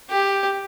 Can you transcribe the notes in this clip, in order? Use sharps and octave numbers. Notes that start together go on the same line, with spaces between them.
G4